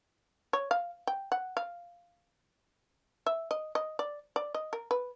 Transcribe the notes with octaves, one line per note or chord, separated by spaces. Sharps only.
C#5
F5
G5
F#5
F5
E5
D#5
D#5
D5
D5
D#5
A#4
B4